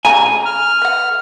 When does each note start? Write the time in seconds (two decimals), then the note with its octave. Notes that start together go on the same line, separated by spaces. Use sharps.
0.05 C#3 G3 G#5 A#5
0.45 F6
0.82 B4 F#5